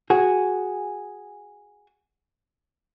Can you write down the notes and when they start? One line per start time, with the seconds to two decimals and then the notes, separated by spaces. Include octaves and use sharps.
0.10 F#4 G#4